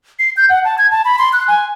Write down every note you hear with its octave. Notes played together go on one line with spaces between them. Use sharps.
C7
G6
F#5
A5
G#6
A5
B5
C6
F#6
G#5